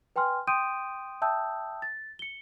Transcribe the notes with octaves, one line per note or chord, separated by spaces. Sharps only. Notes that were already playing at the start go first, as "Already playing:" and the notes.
B4 G5 G#5 C6 F6
G5 C6 D#6 G6 D7 D#7
E5 G5 A5 D#6 E6 G6
A6
C#7 G7